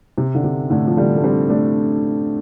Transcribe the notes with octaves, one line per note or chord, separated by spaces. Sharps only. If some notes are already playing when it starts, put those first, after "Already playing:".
C3
D3
C3
A2 D3
F3
D3 G3
A3
G3 C4
A3 D4